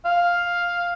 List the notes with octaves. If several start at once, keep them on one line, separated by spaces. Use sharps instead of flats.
F5